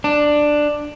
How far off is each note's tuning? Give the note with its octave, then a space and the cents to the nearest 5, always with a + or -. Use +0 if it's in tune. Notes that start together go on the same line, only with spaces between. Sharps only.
D4 +10